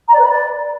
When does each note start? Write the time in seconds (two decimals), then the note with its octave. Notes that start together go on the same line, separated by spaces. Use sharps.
0.08 A#5
0.14 D5
0.19 B4
0.24 B5
0.30 D5